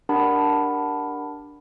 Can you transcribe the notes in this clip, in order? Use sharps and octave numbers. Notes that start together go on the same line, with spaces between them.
D4 G4 A#4 F#5 A5 B5